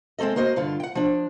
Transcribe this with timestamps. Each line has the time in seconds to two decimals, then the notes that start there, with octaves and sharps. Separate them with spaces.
0.18 G#3 C4 C#4 A4 D#5
0.36 A#3 F#4 C5 D#5
0.56 G2 D3 F4
0.80 F#5 G5
0.95 F3 D4